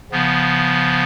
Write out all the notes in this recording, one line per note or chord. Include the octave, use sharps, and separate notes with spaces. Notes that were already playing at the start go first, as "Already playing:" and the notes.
C#3 F3 B3